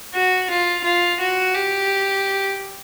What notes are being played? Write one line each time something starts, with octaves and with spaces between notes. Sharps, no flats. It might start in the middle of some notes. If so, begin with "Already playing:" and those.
F#4
F4
F4
F#4
G4